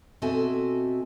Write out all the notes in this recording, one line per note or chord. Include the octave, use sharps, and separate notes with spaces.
B2 C4 F#4 A4 E5 G#5